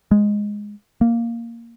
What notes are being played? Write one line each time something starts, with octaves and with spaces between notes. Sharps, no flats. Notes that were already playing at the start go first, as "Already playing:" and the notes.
G#3
A#3